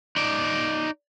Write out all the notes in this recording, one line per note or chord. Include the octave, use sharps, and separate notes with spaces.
D#4 D5